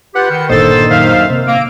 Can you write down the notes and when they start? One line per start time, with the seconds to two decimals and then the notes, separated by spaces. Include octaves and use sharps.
0.15 F4 G4 B4 F#5 G6 C#7
0.29 D#3
0.50 G1 A#2 D3 D#3 A4 C5 D#5
0.89 F#2 D#3 C5 E5 F5
1.30 C3 A#3
1.47 A#3 E6 D7